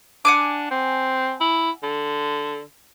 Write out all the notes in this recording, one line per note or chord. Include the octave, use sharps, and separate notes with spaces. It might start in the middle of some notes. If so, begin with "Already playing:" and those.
D4 F#5 G#5 D6
C4
E4
D3